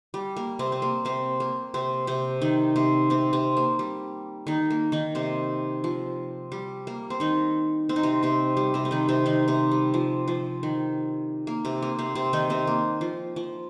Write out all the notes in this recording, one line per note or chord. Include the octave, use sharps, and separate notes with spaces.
G3
A#3
C3 C4
C4
A#3
C3 C4
A#3
C3 C4
C3 C4
D#3 D#4
C3 C4
C3 C4
C3 C4
A#3
G3
D#3 D#4
A#3
D#3 D#4
C3 C4
F3
G3
A#3
C4
D#3 D#4
C4
D#4
C3 C4
C3 C4
G3
C3 C4
C4
D#3 D#4
C3 C4
D#3 D#4
C3 C4
G3
F3
F3
D#3
A#3
C3 C4
A#3
C3 C4
C3 C4
D#3 D#4
C3 C4
A#3
F3
F3